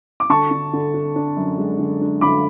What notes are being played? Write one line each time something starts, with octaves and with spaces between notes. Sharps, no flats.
D6
D3 A5 C#6
D3
D3
D4
D4
F#2
G#3
D3
D4
D3 B5 D6